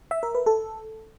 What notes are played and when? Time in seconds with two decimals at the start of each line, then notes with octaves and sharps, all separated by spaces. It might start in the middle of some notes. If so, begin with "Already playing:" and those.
0.11 E5
0.23 A#4
0.35 B4
0.46 A4